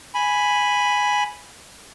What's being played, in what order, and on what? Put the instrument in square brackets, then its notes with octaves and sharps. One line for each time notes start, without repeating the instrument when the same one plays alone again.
[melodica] G#5 B5